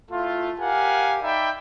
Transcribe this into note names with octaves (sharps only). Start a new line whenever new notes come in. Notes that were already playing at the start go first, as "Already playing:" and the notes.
A3 E4 F4
G4 A#4 F5 F#5 G#5
D#4 D5 E5 G5 B5